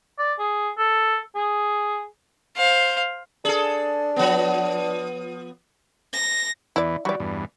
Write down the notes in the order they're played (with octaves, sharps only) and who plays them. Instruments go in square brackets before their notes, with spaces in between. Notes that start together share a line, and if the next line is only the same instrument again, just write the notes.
[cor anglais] D5
G#4
A4
G#4
[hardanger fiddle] C5 F5
[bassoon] D4 [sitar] G#4 A4
[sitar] F3 B3
[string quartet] A#6
[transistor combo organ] E2 E3 [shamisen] E4 D5
[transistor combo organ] E3 F#3 G3 [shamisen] F#4 D5
[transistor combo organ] E2 G2